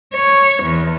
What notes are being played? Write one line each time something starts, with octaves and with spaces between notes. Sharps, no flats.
C#5
E2